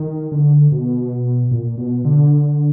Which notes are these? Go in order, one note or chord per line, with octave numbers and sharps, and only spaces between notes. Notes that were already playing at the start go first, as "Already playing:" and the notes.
Already playing: D#3
D3
B2
A#2
B2
D3